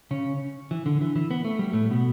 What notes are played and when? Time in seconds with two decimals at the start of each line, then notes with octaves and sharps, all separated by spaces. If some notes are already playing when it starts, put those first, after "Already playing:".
0.11 C#3 C#4
0.71 E3
0.86 D3
1.01 E3
1.16 E3
1.31 B3
1.45 A3
1.59 G3
1.73 A2 A3
1.90 B2 B3